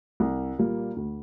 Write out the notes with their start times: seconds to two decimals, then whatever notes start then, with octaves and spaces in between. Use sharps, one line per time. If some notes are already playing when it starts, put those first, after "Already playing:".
0.20 C2
0.58 A#2 G3 A#3
0.97 D2